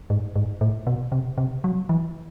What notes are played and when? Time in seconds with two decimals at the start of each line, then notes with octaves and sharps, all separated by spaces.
0.10 G#2
0.36 G#2
0.61 A2
0.87 B2
1.12 C3
1.38 C3
1.64 F#3
1.89 E3